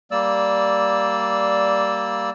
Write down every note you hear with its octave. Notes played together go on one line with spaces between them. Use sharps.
G3 A#3 D5 E6